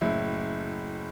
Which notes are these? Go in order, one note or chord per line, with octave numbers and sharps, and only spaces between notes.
F#1 A2 E4